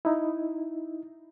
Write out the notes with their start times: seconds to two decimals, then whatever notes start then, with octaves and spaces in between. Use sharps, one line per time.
0.05 D#4 E4